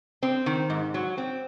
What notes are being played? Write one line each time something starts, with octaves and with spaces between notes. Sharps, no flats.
C4
D#3
G#2
F#3
C4